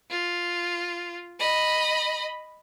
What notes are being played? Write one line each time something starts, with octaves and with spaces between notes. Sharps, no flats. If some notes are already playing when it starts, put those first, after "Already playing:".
F4
D#5 B5